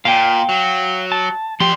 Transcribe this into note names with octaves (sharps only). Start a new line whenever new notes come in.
A#2 F5 G5
F#3
A5
F3 G3 G4 C6